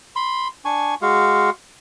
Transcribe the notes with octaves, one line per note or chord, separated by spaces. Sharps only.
B5 C6
D4 G#5 C#6
G#3 F#4 F5